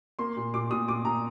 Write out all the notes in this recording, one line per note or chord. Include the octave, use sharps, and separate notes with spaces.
A#3 C6
A#2
A#2 D6
A#2 D#6
A#2 D6
A#2 A#5